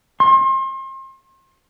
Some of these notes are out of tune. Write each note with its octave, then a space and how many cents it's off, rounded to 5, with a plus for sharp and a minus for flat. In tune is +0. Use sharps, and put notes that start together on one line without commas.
C6 +35